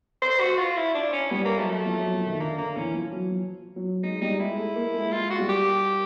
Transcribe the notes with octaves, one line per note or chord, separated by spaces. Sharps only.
C5
F#4
F4
E4
D4
C#4
G3 B3
A#3
F#3 A3
A3
F3
F#3
F3
D#3
D3 A#3
D3 A#3
E3 C#4
F3
F#3
F3
F#3
G#3 D#4
G3 D#4
G#3 E4
A3
A#3
G#3
G#3 F4
F#4
G3
G4